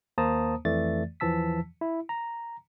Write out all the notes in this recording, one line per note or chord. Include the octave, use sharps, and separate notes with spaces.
D#2 A#3 C5 A5 A#5 D#6
F2 E3 A3 D5 A6
E2 E3 F3 A5 E6 B6
E4
A#5